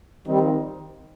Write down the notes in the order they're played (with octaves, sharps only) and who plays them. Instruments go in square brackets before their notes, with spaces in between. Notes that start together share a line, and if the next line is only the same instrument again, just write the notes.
[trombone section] D#3 C4 D#4 [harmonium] G3
[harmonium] F3